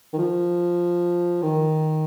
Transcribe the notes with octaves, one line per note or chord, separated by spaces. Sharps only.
D#3
F3
D#3